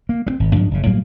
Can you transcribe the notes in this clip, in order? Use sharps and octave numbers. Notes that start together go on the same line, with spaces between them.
A#3
G3 C4
G#1
G#2 F3 F#3 D4
F#1 C#3
A2 F#3 G3 A#3